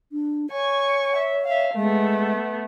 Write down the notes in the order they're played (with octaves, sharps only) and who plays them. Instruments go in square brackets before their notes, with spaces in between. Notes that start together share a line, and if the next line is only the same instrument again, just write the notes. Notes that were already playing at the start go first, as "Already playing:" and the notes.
[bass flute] D4
[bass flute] C#5 [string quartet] G#5 C#6
[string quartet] E5
E5 F5
[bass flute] G#3 [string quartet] A3 B3